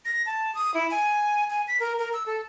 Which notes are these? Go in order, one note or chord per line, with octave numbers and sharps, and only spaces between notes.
A#6
A5
D#6
E4
G#5
G#5
B6
A#4
A#4
E6
A4